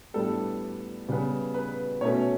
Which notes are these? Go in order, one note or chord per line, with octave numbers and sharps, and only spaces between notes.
A2 G3 B3 D4 A4
C#3 G3 B3
B4
B2 A3 C#4 C#5